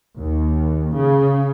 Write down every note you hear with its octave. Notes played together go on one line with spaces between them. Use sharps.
D#2
C#3